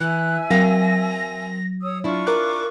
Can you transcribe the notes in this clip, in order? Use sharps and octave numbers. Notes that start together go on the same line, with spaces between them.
E3 E5 G#5 E6 F#6
F#3 C4 A#4 F5 A#6
C#5 D#6 E6
D4 E4 F4 C#6
A#4 D6 F#6